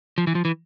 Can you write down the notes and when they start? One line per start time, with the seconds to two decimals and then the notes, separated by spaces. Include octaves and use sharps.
0.18 F3
0.27 E3
0.35 F3
0.45 E3